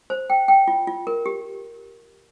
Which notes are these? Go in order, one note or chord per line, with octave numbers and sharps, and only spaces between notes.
C5
G5
G5
F4
F4
A#4
G4